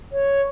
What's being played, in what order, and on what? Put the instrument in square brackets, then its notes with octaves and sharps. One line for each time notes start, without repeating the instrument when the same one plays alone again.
[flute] C#5